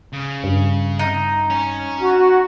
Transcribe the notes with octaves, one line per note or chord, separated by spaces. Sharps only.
C#3
G2
D#4
C#4
F#4